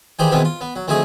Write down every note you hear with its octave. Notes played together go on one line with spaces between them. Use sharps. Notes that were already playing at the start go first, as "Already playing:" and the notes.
D#3 E3 G3 G4 G#4 C5
B2 D#3 E3 G#3 B3 C4
F4
B3
F#3
D2 F3 A3 C4 D#4 G#4